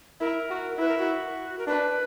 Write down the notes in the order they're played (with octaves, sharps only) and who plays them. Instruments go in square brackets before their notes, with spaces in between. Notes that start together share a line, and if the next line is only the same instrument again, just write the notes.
[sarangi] E4 [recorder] A#4
[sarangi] F#4
[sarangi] E4 [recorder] B4
[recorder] A#4
F#4
A#4
[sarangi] D4 [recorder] B4